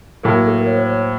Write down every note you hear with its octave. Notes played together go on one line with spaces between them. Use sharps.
A2 F#3 A#3 A#4
A#4
A4
A#4
C#5
C5
C#5
C5